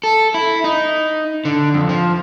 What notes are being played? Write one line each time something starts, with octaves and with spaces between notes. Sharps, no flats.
A4
E4
D#4
D3
F2
F3